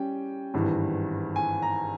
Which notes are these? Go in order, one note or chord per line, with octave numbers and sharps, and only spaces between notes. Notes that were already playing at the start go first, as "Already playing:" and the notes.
Already playing: G3 C#4 G5
G#1 G2 E3
G#5
A#5